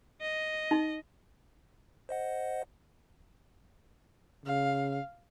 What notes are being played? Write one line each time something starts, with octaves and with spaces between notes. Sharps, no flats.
D#5
D#4
C5 D#5 F#5
C#3 F5